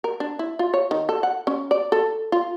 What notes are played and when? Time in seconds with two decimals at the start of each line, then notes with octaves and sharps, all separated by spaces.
0.04 A#4
0.20 D4
0.39 E4
0.59 F4
0.74 C#5
0.91 D#3
1.09 A4
1.23 F#5
1.47 C#4
1.71 D5
1.92 A4
2.32 F4